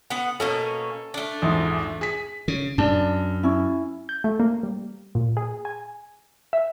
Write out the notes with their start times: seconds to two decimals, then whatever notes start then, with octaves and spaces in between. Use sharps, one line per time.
0.10 B3 F#5
0.40 B2 A#3 C#4 A4
1.14 A3 D4
1.42 A#1 E2 G#2
2.01 G#4 B6
2.48 C#3
2.78 F#2 D4
3.43 C#4 E4
4.09 G6
4.24 A3
4.40 A#3
4.63 G3
5.15 A#2
5.37 G#4
5.65 G#5
6.53 E5